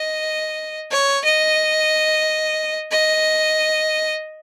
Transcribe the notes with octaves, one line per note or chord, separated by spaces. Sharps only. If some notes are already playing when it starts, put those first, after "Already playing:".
Already playing: D#5
C#5
D#5
D#5